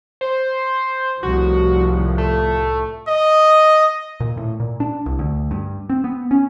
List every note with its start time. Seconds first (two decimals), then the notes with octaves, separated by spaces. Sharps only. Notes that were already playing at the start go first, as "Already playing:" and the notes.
0.21 C5
1.23 C2 A2 F3 F#4
2.18 A3
3.08 D#5
4.20 A#2
4.37 A2
4.60 A#2
4.80 D4
5.06 C2
5.19 D2
5.51 G2
5.90 C4
6.04 B3
6.31 C#4